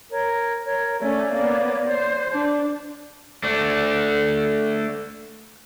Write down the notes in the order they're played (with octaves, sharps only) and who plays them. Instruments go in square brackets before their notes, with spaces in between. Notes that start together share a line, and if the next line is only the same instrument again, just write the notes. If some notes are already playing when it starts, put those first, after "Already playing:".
[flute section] A#4 C#5
A#4 C#5
[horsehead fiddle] A3 C#4 [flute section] C#5 D5
[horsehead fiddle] A#3 B3
C5
D4
[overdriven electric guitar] A3 D4